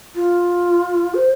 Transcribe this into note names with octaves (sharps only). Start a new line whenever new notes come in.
F4
C5